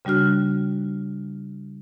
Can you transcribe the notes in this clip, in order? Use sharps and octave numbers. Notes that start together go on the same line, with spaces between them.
C#3 G3 D4 F#4 F6